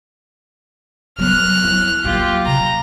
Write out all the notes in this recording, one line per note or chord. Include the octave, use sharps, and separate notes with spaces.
F#3 B3 F6 F#6
F3 E4
F#3 A#3 F4 G4
C3 A#5